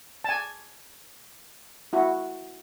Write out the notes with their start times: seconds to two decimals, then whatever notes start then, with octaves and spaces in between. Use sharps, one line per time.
0.24 G#5 A5
1.93 E4 F#4